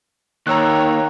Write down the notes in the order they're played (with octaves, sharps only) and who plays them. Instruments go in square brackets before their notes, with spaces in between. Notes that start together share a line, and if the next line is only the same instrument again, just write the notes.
[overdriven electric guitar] D#2 [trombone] D#3 [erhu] C#5 [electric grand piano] A#5 E6 F#6